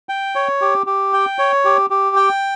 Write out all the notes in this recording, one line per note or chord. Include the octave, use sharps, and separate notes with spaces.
G5
C#5
G4
G4
G5
C#5
G4
G4
G5